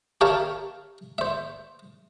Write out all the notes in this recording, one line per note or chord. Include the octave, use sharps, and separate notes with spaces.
G4 A#4 C#5 E5 F5 A5
C5 E5